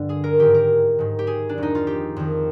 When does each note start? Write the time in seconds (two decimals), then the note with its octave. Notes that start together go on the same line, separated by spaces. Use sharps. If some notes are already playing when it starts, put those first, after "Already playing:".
Already playing: G2 D3
0.09 G#4
0.24 A#4
0.39 G#2 D#3 G4
0.54 A#4
0.99 G#2 D#3
1.19 G4
1.27 G#4
1.49 D4
1.58 F2 D#3 D#4
1.75 F4
1.87 G4
2.16 F2 D#3